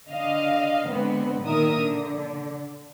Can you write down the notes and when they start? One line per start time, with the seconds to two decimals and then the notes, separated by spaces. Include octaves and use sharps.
0.10 D3 D#5 F5
0.89 D3 G#3 B3 C4
1.44 A#2 D#3 A#4 E5 D#6
1.78 D3